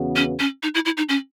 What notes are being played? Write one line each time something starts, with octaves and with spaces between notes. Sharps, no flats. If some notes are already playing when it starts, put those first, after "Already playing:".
Already playing: E2 C#3 E3 B3 F#4
C#4
C#4
D#4
E4
E4
D#4
C#4